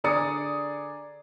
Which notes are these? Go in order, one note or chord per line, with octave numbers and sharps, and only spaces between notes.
D3 G#4 D5 A#5 D#6 C#7